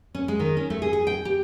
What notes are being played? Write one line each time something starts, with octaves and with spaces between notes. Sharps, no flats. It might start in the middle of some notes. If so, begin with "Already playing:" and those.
C#4
G#3
D#3
C#4
A3
G#4
G#4
G5
G4